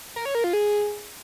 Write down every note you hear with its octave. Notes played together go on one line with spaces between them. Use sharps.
A#4
C#5
A#4
F4
G#4